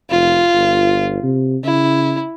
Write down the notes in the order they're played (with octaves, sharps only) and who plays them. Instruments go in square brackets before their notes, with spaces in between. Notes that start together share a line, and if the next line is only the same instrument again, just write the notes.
[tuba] F1 [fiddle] F4
[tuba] G1
C3
[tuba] C#3 [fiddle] E4